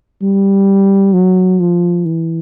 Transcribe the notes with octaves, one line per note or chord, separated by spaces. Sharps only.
G3
F#3
F3
E3